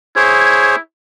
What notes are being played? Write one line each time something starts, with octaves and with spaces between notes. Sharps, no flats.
E4 G#4 C5 C#5